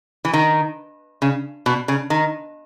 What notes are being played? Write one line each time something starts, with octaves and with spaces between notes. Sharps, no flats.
E3
D#3
C#3
B2
C#3
D#3